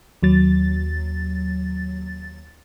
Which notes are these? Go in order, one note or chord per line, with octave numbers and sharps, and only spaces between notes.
D#2 F#3 A6